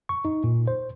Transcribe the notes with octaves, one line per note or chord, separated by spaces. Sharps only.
C#6
D#4
A#2
C5